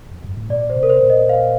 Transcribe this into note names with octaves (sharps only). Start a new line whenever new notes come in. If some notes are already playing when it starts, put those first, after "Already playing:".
F2
G2
A2
A#2 D5
C5
C3
A#4
C5
A#2
D#5
F5